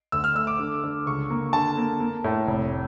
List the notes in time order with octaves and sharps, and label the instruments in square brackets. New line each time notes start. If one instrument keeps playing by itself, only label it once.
[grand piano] D2 E6
F6
A3 E6
D6
D3
D3
C#2 C#6
A#3
D3 A5
A#3
A#3
A2
F1